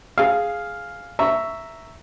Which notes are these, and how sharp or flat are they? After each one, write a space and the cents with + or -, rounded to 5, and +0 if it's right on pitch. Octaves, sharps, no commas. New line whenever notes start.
G#4 +0 F5 +0
E5 +0 A#5 -5 C#6 +10